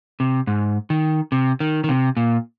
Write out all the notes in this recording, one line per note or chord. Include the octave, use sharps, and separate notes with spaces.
C3
G#2
D#3
C3
D#3
D#3
C3
A#2